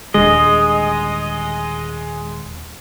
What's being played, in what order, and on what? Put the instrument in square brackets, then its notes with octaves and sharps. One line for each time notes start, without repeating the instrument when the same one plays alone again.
[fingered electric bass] D#1 D3 [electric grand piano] G#3 [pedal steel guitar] D#5